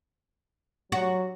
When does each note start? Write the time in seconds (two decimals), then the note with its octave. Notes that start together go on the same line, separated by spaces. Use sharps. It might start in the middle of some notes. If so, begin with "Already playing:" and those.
0.92 F#3 F#4